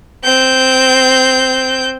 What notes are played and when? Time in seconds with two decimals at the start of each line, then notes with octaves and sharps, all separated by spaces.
0.24 C4 G6